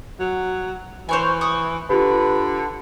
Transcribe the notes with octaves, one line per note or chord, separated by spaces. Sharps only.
F#3
E3 C5 C#5 G#5
C#6 D#6
D3 F4 G4 B4